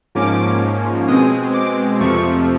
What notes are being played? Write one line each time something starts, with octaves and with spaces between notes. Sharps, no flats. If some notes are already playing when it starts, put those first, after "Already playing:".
G#2 F3 A#3 C#4 D6
B2 G#3 C4 D#6
D6
F2 C3 F3 A3 C#6